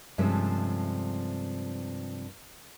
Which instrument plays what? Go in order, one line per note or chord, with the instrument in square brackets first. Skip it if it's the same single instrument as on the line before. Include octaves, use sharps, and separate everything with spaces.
[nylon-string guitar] G2 C3 F3 G#3 A3 C#4